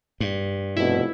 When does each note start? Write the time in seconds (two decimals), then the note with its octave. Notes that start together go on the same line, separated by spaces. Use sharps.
0.20 G2
0.77 F1 B2 E4